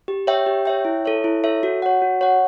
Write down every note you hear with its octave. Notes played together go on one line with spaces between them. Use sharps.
G4
C#5 E5 G5
G4
C#5 E5 G5
E4
A4 C#5 E5
E4
A4 C#5 E5
F#4
C#5 F#5
F#4
C#5 F#5